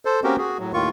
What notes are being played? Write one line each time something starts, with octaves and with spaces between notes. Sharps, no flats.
A4 C5
A#3 C4 C#4 F#4 G4 A#4
F#4 G#4
A2 F#3
D#2 A2 D#3 F4 C#6